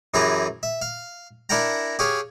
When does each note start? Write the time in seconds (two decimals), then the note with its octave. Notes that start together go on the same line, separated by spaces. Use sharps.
0.14 F#2 E3 G4 G#4 B4 A#5
0.63 E5
0.82 F5
1.49 D4 E4 A#4 F#5 G5 A#5
1.99 G4 G#4 C#5 F5